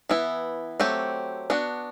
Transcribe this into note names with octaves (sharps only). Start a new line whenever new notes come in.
E3 B3 E4
F#3 A3 C4 G4
B3 D4 F#4